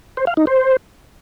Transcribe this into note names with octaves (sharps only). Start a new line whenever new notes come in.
C5
F5
D#4
C5